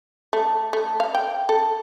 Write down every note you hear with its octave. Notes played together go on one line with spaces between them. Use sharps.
A3
A3
F5
G5
A4